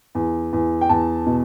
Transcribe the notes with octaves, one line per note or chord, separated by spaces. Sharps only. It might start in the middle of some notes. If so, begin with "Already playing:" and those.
E2
E2
G5
E2 A5
B2